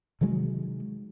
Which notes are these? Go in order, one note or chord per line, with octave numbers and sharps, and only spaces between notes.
C3 D#3 F#3 G#3